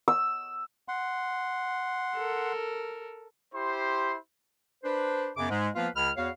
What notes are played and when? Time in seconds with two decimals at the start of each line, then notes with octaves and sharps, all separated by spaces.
0.08 E6
0.88 F#5 C6
2.16 A4 A#4
3.54 E4 G4 C5 C6
4.83 D4 B4 C5
5.37 F#2 C#3 B3 D6
5.49 G#2 G#3
5.75 F3 A#3 B3 F4 B4 F5
5.96 C#2 C#3 B5 F6
6.16 E2 B3 F#4 C#5 F5